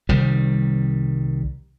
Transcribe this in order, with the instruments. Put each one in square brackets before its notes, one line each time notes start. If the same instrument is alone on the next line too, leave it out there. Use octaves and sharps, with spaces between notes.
[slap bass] C2 D#3 G3